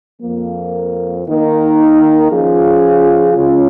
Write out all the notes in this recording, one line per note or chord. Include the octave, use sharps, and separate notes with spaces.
F2 F3 A#3
D#3 A#3 D#4 A#4
F3 C#4 F4 G#4
C#3 G#3 C#4 F4